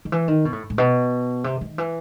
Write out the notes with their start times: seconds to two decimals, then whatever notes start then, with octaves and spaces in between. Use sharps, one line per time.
0.05 D#3
0.12 E3
0.28 D#3
0.45 B2
0.53 A2
0.70 A2
0.78 B2
1.44 C3
1.61 D#3
1.78 E3